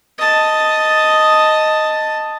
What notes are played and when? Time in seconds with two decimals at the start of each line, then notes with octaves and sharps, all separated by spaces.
0.18 D#5 A5